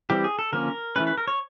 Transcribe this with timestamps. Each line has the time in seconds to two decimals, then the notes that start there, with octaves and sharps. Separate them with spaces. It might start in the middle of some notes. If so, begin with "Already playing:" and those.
0.10 E3 G3 C4 G4
0.24 G#4
0.39 A4
0.53 D3 F3 A#3 C#4 A#4
0.96 E3 A3 C#4 B4
1.07 B4
1.18 A#4
1.28 C#5